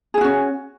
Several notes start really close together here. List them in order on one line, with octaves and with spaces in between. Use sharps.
G#4 E4 F#4 C#4